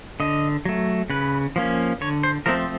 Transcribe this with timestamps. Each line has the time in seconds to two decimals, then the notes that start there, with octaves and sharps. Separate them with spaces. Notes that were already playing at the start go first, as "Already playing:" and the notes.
0.20 D3 D#5
0.65 F#3 A3
1.10 C#3 B4
1.56 F3 A#3 C#4
2.01 D3 C#5
2.23 C5
2.46 F3 A3 C4 A#4